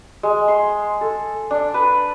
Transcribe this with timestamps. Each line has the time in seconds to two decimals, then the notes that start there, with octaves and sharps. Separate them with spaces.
0.23 G#3
0.48 C6
1.01 A4
1.51 D4
1.74 B4